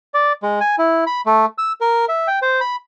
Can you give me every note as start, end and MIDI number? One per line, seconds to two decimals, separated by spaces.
0.14 0.33 74
0.43 0.60 56
0.60 0.76 80
0.78 1.04 64
1.07 1.21 83
1.26 1.45 57
1.58 1.72 88
1.81 2.05 70
2.09 2.27 76
2.27 2.39 79
2.42 2.60 72
2.61 2.76 83